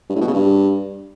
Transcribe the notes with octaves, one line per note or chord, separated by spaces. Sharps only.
G2
A2
B2
C#3
G2